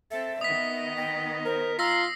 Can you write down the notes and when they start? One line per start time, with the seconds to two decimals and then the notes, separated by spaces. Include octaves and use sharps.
0.11 C4 A4 E5
0.41 D#3 B3 D#5 D#6 B6
0.96 G5
1.45 A#4 C5
1.79 F4 A#5 E6 A#6 C7